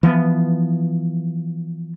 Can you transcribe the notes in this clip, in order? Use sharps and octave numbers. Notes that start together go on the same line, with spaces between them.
E3 F3 G#3 B3